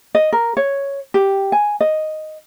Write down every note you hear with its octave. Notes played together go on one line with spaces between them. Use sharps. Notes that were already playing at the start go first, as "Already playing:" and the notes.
D#5
A#4
C#5
G4
G#5
D#5